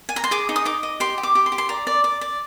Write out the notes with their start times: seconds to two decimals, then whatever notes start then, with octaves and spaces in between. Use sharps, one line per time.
0.09 G#5
0.16 A#5
0.24 C6
0.31 G#4 D6
0.49 D#4
0.56 D#6
0.65 D#4 D6
0.83 D#5
1.00 G4 C6
1.18 G4
1.23 D6
1.35 G4
1.46 C6
1.52 G4
1.58 C6
1.69 D5 A#5
1.87 D5
2.04 D5
2.21 D5